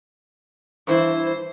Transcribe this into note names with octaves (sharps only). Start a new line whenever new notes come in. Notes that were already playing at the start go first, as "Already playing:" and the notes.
G2 E3 E4 C5